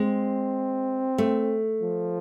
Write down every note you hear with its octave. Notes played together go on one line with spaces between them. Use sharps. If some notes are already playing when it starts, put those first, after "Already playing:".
Already playing: G#3 C4
A3
F3